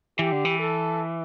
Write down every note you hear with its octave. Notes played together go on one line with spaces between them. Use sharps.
E3 G4
D3
E3
A4